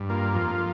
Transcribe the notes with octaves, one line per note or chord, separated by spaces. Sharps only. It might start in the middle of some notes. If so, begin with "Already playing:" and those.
Already playing: G2
A#3 F4
F2